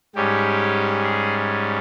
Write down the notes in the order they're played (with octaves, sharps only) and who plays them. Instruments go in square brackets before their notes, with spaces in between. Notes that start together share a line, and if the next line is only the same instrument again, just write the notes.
[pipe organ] G#2 G3 C#4 G4
G#4